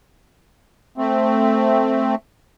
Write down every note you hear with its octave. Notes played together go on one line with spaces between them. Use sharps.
A3 C4